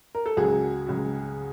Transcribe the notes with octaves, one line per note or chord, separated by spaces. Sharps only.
A#4
A4
C#2 C#3 F#3 F#4 G#4
C#2 C#3 F#3